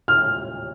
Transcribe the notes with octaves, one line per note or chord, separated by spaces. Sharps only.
F6